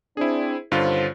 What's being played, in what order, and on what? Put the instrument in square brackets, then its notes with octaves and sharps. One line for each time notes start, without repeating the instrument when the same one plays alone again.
[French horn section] C4 D4 [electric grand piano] E4 G#4
[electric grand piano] G2 D3 F4 [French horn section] D#3 C#4 C5